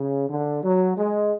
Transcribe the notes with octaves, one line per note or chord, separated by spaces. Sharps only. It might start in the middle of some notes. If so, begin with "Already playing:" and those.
Already playing: C#3
D3
F#3
G#3